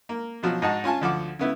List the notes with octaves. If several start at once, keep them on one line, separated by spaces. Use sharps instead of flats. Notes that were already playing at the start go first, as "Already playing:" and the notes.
A#3
B2 F3 F#3
G#2 D#4 F#4 A5
C#4 F4 G#5 A5
D2 F3 F#5 D6
C#3 B3 E4